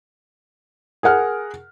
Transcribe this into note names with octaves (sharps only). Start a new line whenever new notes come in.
G#4 A#4 F#5 F6